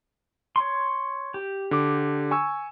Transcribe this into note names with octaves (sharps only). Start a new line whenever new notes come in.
C#5 C6
G4
D3 D6
G#5 C#6 E6